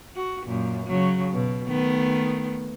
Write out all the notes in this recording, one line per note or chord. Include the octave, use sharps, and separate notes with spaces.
F#4
F#2 A#2
C#3 F#3
B2
D#3 A3 B3